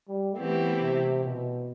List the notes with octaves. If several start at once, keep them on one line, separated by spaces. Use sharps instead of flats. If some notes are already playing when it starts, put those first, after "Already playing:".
G3
E3 A3 B3 C4 E4 G4
C3
B2